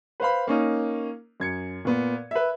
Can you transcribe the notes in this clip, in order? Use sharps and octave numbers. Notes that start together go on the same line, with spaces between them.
B4 C5 F5 B5
A#3 C#4 D#4
F#2 G#6 C#7
A#2 B3
B4 E5